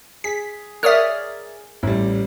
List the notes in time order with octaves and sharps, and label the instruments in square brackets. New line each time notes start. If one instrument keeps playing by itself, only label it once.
[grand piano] G#4 [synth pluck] B6
[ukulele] A#4 C#5 D5 [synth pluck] E5 D#6 F6
[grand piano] A1 G3 [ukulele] E4